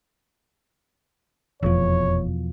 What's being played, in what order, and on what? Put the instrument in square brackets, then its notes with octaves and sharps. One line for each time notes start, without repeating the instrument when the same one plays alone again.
[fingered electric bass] F1 [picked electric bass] E2 B2 F3 [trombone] C#5